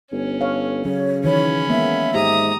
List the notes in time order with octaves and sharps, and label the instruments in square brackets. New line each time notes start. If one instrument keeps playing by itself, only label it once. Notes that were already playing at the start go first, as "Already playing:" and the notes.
[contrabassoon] G1 [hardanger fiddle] C#4
[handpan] A4 C#5 F5
[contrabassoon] C#3 [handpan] F#3 [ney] C#5
[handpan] D#3 E3 [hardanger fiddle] C#4 B5 [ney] C#5
[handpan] G#3 A#3 B3 [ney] E5
[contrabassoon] G#2 [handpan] G4 [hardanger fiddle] A#5 D#6